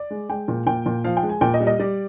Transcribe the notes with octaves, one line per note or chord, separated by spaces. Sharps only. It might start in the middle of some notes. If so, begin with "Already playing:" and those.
Already playing: D5
G#3
G#3 G5
A#2
A#2 G5
A#2
F3 F5
G5
G#3
G#5
A#2 G5
D#5
G3
D#5
G3 D5